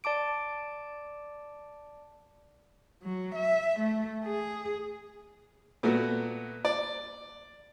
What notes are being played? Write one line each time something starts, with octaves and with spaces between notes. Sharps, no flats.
D5 A5 D6 D7
F#3
E5
A3
G#4
A#2 A3 B3 F#4
D5